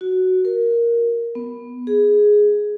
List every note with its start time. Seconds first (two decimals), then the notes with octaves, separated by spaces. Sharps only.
0.01 F#4
0.45 A#4
1.35 B3
1.87 G#4